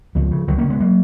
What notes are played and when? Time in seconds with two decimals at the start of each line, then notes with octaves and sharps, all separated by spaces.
0.15 C#2 F3
0.31 C#3
0.47 C#2 D#3 F#3
0.58 A#3 C#4
0.64 C#3
0.69 G#3 B3
0.80 F#3 A#3